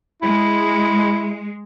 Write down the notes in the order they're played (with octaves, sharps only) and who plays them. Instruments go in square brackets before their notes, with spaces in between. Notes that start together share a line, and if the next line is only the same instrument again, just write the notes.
[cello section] G#3 [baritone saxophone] E4